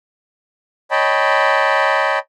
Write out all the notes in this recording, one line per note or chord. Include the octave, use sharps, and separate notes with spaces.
C#5 D#5 G5 A5 B5